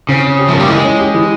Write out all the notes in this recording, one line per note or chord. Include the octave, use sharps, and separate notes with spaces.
C#3 C4
C#4
G4
F3
A#3
G3
E3 G#3
C#4
G4
E3